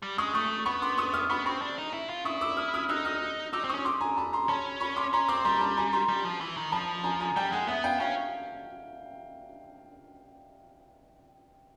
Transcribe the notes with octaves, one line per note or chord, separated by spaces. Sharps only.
G3
G#3 C#6 D#6
A3 C#6 D#6
B3 B5 C#6
C6 D6
C#6 D#6
D#6 F6
B3 B5 C#6
C4 B5 C#6
D4
D#4
E4
F4
E4 C#6 D#6
D6 E6
D#6 F6
D#6 F6
D#4 E6 F#6
D#6 F6
D#4 D6 E6
C4
C#6 D#6
C#4
C6 D6
G#5 A#5
A5 B5
A#5 C6
C#4 A5 B5
B5 C#6
C6 D6
C#4 A#5 C6
C4 C6 D6
G3 A#5 C6
A5 B5
G#5 A#5
A#5 C6
G3
F3
E3
D#3
F3 A5 B5
G#5 A#5
G#5 A#5
G3 G5 A5
G#3 F#5 G#5
B3 E5 F#5
F5 G5
C#4 F5 G5